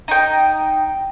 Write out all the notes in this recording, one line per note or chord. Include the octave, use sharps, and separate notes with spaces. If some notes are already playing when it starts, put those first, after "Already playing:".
D#4 G5